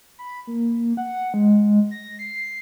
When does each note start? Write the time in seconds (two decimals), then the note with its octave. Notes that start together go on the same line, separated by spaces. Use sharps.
0.19 B5
0.47 A#3
0.97 F#5
1.34 G#3
1.91 A#6
2.19 C7